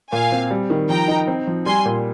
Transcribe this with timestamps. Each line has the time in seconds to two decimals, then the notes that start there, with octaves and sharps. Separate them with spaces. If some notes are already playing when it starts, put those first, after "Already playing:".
0.12 A#2 F5 G#5
0.32 C4
0.51 G3
0.70 D#3
0.89 F3 G5 A#5
1.08 D#4
1.27 C4
1.47 F3
1.66 G3 G#5 C6
1.85 A#2